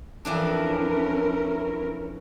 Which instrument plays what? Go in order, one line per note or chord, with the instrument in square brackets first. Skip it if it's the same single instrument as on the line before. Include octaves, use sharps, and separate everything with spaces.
[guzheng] F2 E3 D4 [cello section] C#4 E4 A#4